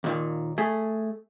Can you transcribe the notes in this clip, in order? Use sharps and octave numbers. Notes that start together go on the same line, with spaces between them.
D#2 A#2 D#3
A3 G#4